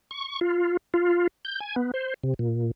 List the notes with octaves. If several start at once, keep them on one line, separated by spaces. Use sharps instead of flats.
C#6
F4
F4
G6
G#5
B3
C5
C3
A#2